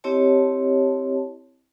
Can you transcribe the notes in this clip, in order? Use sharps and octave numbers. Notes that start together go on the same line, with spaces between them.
C4 E4 G4 C#5 D#5 A5